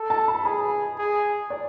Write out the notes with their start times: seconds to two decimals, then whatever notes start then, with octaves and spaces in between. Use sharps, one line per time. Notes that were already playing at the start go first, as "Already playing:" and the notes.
Already playing: A4
0.10 A5
0.28 B5
0.45 G#4 B5
0.99 G#4
1.50 D5